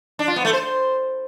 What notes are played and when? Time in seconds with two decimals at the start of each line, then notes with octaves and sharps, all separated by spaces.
0.19 D4
0.28 F4
0.36 B3
0.45 A3
0.53 C5